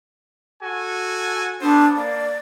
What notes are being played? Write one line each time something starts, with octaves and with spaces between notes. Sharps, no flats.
F#4 A4 G#5
B3 D4 A4 C5
A#3 D5